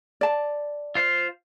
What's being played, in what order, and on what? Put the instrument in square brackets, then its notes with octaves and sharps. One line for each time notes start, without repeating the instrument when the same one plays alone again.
[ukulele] D5 A5
[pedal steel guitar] F4 C5 F5